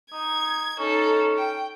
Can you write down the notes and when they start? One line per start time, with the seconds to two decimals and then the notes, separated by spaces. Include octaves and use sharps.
0.12 D#4 G#6
0.78 C#4 D#4 A4
1.37 G5